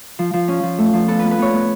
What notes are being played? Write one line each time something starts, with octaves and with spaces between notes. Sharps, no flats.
F3
F3
C#4
F3
A3
F3
B3 A4
B3 B4
B4
B3 C#5
B3